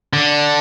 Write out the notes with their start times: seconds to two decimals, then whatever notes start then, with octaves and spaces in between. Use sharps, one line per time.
0.13 D3